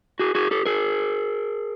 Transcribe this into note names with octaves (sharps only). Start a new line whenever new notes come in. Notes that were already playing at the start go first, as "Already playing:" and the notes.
F#4 G#4
F#4 G#4
G4 A4
G#4 A#4